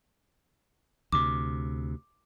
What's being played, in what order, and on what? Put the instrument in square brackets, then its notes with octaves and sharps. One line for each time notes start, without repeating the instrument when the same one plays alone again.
[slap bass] D2 C3 [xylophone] D6